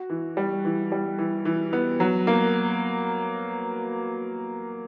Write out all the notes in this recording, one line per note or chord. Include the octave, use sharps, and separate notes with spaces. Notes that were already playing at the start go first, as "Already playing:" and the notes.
Already playing: F#4
E3
G3
E3
G3
E3
E3
B3
F#3
A#3